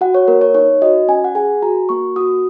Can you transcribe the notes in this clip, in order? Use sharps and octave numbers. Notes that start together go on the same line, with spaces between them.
F#4 F#5
C#5
A#3 A#4
C#5
D#4 C#5
F#4 D#5
C#4 G#5
F#5
G#4 G#5
F#4 A#5
A#3 C#6
F#4 D#6